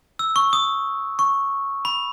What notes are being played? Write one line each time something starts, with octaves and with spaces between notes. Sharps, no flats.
E6
C#6
D#6
C#6
B5